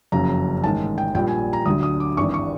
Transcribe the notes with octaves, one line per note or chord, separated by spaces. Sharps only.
F#1 F2 C#3 F#3 A#5
A1 G#2 D#3 G#3 A5
G5
A#1 A#2 G3 G5
G#5
A#5
D2 D3 F#3 D#6
D#6
D6
G#1 G2 E3 G3 C#6
C#6